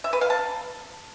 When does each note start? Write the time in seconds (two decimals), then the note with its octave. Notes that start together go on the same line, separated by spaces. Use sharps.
0.04 E5
0.13 B4
0.21 F5
0.30 A5